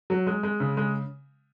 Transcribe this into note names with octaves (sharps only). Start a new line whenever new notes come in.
F#3
G#3
G#3
C#3
G#3